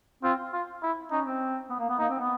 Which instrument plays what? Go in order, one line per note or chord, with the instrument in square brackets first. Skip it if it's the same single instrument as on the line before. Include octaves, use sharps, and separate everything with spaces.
[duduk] C4 [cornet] F4
[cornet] F4
E4
[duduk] C#4 [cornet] D#4
[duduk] C4
B3
A#3
B3
[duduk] A#3 [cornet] D#4
[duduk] C4
B3